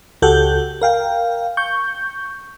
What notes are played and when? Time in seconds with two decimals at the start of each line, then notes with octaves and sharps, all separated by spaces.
0.22 C#2 F#4 G4 A4 F#5 G6
0.81 A#4 F5 G5
1.57 C#6 G6